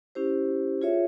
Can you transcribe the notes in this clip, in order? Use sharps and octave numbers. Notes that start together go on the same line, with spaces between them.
C#4 E4 G4 C5
F4 G#4 C#5 E5